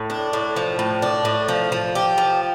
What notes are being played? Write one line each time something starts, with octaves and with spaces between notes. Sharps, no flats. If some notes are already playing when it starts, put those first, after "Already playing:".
Already playing: A2
D4
A2
F3
A2
D4
A2
F3
F3
G4
F3